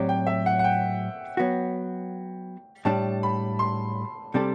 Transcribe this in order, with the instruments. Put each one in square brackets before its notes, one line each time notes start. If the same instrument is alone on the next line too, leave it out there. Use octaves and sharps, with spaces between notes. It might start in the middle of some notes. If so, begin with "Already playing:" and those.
Already playing: [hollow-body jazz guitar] A2 F#3 C4 G4 D5
[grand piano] G5
E5
F#5
F#5
G5
[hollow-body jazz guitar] F#3 B3 F#4
[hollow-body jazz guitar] A2 G3 D4 [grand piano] A5
[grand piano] B5
C6
[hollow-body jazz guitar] C3 G3 D4 A4